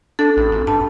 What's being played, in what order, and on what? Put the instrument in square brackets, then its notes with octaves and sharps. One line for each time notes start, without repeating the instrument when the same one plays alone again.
[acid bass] D4 [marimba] A4
[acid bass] A1
G#1
[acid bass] G2 [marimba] A5